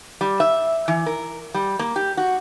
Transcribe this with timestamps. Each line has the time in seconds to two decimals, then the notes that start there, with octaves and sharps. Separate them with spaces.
0.21 G3
0.40 E5
0.88 E3
1.06 A#4
1.54 G3
1.79 A#3
1.96 G4
2.17 F#4